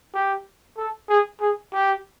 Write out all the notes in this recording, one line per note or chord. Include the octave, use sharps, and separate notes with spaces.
G4
A4
G#4
G#4
G4